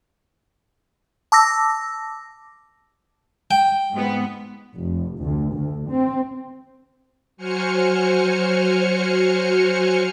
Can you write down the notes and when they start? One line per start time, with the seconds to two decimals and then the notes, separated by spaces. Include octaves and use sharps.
1.32 A5 D6 E6 A#6
3.51 G5
3.92 G#2 B3
4.78 F1
5.21 D2
5.54 D2
5.90 C4
7.37 F#3 F#4 C5 G#5 F6 C#7